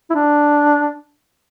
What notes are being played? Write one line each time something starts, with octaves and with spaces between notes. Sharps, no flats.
E4
D4